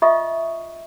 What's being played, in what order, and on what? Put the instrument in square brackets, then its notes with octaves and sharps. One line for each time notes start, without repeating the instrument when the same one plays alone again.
[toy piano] F4 D#5 E5 C#6 D#6